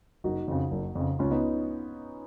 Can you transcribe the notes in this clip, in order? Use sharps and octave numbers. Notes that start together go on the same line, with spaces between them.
F#1 D#4 F#4
F2 C#3
F#1
F2 C#3
C#2 C#4 F4
B3 D#4